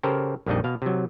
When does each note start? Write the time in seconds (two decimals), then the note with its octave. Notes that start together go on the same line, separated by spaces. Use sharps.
0.03 C#3 G4 A4 A#4 C5
0.47 A#1 F2 G3 D4 D#4 D#5
0.64 B2 F5
0.82 C3 F#3